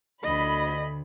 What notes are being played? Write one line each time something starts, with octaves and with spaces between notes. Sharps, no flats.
D2 D3 D#5 B5